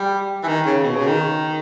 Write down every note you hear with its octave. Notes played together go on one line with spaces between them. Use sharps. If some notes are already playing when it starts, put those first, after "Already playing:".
Already playing: G3
E3
D#3
C#3
B2
C#3
D#3